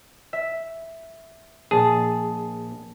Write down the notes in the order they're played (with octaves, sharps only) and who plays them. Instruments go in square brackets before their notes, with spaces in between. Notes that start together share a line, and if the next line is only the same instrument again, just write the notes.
[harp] E5
[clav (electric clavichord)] A#1 G#4 [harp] A5